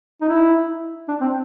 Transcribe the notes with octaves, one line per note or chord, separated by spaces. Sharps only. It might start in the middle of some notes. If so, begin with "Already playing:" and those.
D#4
E4
D4
C4